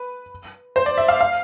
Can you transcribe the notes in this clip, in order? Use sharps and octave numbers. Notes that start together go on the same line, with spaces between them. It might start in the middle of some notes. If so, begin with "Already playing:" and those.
Already playing: B4
C5
D5
E5
F5
F5